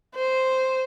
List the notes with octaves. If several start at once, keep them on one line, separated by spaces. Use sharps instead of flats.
C5